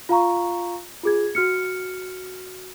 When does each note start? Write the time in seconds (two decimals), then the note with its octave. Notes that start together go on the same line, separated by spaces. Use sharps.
0.09 F4 F5 A#5 C#6
1.04 F4 G#4 G#6
1.35 F#4 F6 C#7